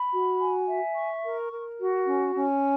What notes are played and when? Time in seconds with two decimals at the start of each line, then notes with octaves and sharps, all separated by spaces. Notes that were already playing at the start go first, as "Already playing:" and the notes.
Already playing: B5
0.12 F#4
0.40 G#5
0.67 E5
0.96 C#6
1.24 A#4
1.51 A#4
1.79 F#4
2.07 C#4
2.35 C#4